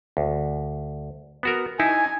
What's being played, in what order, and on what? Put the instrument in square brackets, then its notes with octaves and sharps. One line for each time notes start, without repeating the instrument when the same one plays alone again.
[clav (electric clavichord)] D2
B3 F#4 A#4
[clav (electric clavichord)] D#4 E4 [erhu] G#5